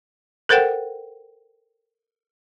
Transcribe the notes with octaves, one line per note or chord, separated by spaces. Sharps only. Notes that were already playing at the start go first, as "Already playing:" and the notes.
A4 A#4 C5 F#5 G5